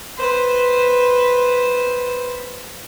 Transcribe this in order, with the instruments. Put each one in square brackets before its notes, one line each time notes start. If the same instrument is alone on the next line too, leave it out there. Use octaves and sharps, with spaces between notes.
[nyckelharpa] B4 C5